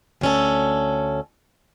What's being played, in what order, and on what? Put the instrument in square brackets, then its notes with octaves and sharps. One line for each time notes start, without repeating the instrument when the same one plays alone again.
[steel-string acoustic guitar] D2 C#4 A4